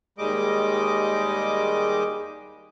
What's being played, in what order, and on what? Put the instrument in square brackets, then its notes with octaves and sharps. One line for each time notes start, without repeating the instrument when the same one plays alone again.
[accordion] D#2 G3 G#3 D#5 D6